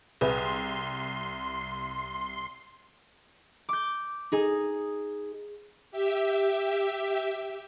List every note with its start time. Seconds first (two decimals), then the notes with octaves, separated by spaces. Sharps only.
0.21 C2 G#4 B4 E5 C6
3.69 D6 G6
4.32 D#4 G#4
5.91 G4 E5